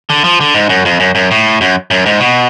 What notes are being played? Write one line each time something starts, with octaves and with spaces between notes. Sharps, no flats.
D3
F3
D3
G#2
F#2
F2
F#2
F#2
A2
F#2
F#2
G#2
B2